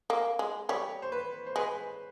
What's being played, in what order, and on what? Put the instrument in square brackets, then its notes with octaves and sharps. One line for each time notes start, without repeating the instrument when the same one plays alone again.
[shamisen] A#3
G#3
[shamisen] G3 [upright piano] C#5
[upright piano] C5
B4
C5
[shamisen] G#3 [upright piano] B4